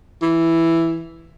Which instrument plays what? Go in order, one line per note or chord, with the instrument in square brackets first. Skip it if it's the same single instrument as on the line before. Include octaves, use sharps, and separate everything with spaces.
[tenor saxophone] E3